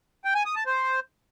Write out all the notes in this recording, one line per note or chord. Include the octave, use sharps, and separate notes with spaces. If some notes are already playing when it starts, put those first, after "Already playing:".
G5
G#5
D#6
A5
C5